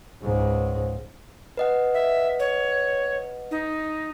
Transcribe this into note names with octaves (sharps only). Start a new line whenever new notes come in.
C#2 G#2
B4 D#5 F#5
E5
C#5
D#4